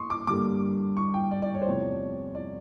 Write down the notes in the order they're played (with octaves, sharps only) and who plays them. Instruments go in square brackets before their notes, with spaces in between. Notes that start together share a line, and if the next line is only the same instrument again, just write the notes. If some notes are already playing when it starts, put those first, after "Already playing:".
Already playing: [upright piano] E3 C6 C#6 D#6
D6
G2 D3 G3 A#3 D6
C#6
G5
D5
D5
C#5
C5
E2 C3 F3 A3 C#5
D5